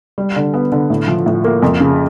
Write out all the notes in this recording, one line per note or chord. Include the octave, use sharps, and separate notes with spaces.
G3
D3
B3
D3
A2
F3
A2
A#3
F2
C#3